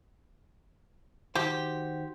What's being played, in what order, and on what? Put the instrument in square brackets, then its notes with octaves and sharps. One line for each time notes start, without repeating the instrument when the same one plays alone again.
[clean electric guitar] D#3 F#4 C5 [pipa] G4